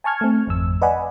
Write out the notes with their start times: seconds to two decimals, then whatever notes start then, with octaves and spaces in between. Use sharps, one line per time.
0.04 G#5 A5 C#6 F6 G#6
0.21 A3 C4
0.47 G#1 F2 E6
0.82 B4 D5 D#5 F#5 G#5 B5